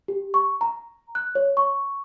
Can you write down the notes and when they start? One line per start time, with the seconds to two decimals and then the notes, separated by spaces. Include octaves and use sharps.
0.08 G4
0.34 C#6
0.61 A#5
1.15 F#6
1.35 C#5
1.57 C#6